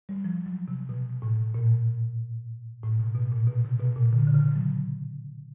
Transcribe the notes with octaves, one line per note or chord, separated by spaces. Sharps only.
G3
F3
F#3
C3
B2
A2
A#2
A2
B2
B2
A#2
B2
C3
B2
A#2
D3
C#3
D3
C#3
F#3